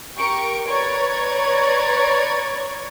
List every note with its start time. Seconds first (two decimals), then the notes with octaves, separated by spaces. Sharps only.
0.17 G4 A#4 C#6 D7
0.68 B4 C#5 D5 A#5 C#6 G#6